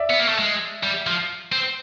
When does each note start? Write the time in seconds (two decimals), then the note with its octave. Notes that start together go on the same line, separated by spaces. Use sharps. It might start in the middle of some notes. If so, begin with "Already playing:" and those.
Already playing: D5 E5
0.10 B3
0.20 A#3
0.29 A3
0.39 G#3
0.83 G3
1.07 F3
1.52 C4